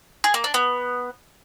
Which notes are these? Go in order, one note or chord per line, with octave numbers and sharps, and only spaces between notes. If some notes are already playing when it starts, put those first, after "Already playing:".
G#4
A#3
D4
B3